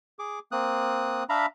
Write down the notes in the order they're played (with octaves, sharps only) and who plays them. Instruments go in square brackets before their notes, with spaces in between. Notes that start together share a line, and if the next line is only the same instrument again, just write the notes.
[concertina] G#4 D6
A#3 C4 D#6 F#6
D4 E5 F5 A#5 B5